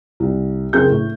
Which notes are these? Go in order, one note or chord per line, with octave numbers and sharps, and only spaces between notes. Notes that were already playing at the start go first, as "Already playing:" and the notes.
C2
F#1 C4 G#4 A#4 G6
A2 A3